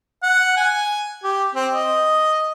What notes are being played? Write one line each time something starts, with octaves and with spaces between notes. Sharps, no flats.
F#5
G#5
G4
C4
D#5